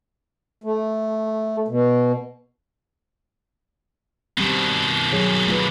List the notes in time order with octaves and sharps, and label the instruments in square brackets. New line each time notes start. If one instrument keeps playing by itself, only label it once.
[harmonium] A3
B2
[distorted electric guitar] B2 D#3 [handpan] G3 C4
[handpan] F#3 G#4 C#5
A3 F4 B4